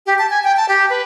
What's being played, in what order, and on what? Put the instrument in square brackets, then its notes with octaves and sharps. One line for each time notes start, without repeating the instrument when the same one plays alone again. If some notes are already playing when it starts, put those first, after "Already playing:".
[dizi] G4
A5
G#5
G5
A5
G4
B4